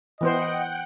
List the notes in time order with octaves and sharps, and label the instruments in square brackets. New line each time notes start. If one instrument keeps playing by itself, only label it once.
[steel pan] E3 B3 C5 [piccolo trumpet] D#5 [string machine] F#5 G5